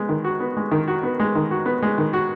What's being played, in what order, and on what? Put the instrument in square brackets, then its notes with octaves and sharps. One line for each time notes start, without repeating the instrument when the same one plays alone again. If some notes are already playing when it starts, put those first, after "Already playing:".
Already playing: [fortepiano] G#3 B3
D#3
F#4
B3
G#3
D#3
F#4
B3
G#3
D#3
F#4
B3
G#3
D#3
F#4